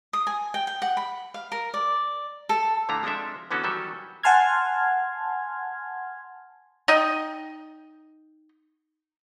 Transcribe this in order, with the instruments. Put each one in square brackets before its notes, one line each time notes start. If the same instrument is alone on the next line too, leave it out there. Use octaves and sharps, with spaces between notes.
[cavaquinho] D#6
G#5
G5
G5
F#5
B5
F5
A#4
D5
A4
[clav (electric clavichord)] A#2 D3 A3 E4 F4 A#5
F3 G#3 C4 D4 A4 E5
D3 E3 B3 C#4 F#4 A4
D#3 E3 F#3 G3 A4 E5
[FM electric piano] F#5 G#5 A5 C6 F6 G#6
[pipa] D#4 D#5 G5